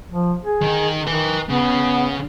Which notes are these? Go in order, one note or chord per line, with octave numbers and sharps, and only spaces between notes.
F3
G#4
D#3 D#4
D#3 B4 G#5
C#3 B3